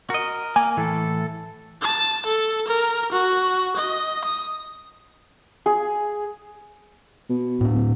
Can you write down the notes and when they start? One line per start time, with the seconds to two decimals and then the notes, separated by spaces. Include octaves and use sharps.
0.10 F#4 A#4 D#5
0.56 A#3 G#5
0.77 A2 E3 A4
1.82 A5
2.26 A4
2.67 A#4
3.12 F#4
3.77 D#5
4.25 D#6
5.66 G#4
7.29 B2
7.61 A2 D4
7.74 D1